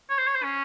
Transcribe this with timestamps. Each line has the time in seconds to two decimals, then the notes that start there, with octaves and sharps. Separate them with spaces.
0.10 C#5
0.18 C5
0.27 C#5
0.35 C5
0.43 C#4